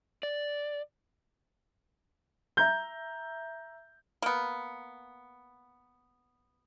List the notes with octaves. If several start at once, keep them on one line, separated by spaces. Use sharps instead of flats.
D5
E5 A#5 G6
A#3 B3